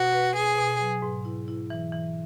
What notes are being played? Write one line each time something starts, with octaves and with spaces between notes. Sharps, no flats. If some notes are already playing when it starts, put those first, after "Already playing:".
Already playing: B2 F#4
B4
B2 G#4
B2
F#3
G#2
E4
E4
E3
E3